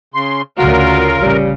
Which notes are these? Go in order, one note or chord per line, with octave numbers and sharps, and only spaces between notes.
C#3 C6
D2 C#3 F4 F#4 A#4
A1 C#3 G3